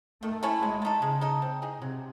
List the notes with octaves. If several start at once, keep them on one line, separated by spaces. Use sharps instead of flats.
D#3 A3
A3 C#4 E4
F#3 G#3
A3 D#4 A4
C#3 G#3
D#4 A4 D#5
C4
D#4 G#4
C3 F#3